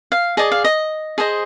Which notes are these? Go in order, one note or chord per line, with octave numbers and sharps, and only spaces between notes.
F5
G#4 D5 D#5
F5
D#5
G#4 C5 D#5